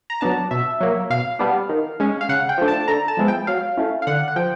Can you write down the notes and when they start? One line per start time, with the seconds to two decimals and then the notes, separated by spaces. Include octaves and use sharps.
0.10 A#5
0.21 F#3 B3 D4 A5
0.51 B2 E5
0.81 F#3 A#3
1.10 B2 F5
1.39 G3 B3 D4
1.69 D#3
2.00 G#3 C#4
2.21 F5
2.29 C#3 F#5
2.49 G5
2.58 F3 A3 D4
2.68 A5
2.88 D3 A#5
3.08 A5
3.17 F3 G#3 B3 E4
3.28 G5
3.47 F#3 F5
3.77 A3 C#4 E4
4.02 F5
4.07 D3 F#5
4.28 F#5
4.36 F3 G5